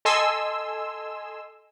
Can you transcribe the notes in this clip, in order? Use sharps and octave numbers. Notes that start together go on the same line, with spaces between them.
A4 D#5 G#5 C6 E6